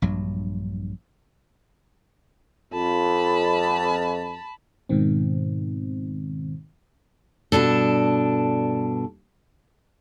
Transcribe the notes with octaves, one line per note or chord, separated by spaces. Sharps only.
A#1 G2 F#3
F2 A5 B5
G#2 B2 D#3 C4
G2 B2 D4 A4